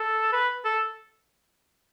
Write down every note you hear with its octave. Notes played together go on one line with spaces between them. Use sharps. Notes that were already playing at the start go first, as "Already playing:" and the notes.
Already playing: A4
B4
A4